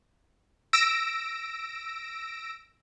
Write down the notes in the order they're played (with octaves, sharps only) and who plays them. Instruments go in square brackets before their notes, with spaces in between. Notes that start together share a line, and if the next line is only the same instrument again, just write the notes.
[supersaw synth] E6 A#6 D7